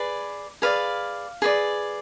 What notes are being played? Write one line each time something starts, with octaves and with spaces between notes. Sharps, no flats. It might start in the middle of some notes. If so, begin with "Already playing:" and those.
Already playing: G#4 B4 D5
G#4 B4 D5 F5
G#4 B4 D5